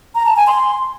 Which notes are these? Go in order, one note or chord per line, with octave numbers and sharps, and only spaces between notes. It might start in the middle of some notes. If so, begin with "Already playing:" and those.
A#5
A5
G#5
C6